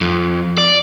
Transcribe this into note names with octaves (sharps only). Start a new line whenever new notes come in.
F2
D5